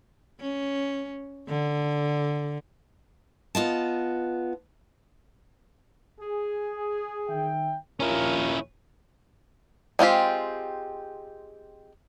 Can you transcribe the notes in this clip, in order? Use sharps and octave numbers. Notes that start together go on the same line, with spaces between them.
C#4
D3
B3 F4 D#5 A5
G#4
D#3 E5 G5
A#1 D#2 C#4 E4 F4 A#4
G#3 C4 F4 G4